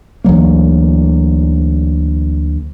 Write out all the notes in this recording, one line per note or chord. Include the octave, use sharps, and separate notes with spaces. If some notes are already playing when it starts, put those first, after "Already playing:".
D2 E3 F#3 A#3